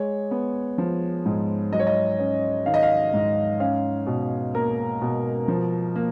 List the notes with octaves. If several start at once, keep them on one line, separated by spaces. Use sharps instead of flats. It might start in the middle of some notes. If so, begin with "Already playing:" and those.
Already playing: G#3 C#5
B3
F3
G#2
F#3 D#5
C#5
D#5
C#4
D#3 F5
D#5
F5
G#2
C#4 F5
B2
A#3 A#4
B2
F3
A#3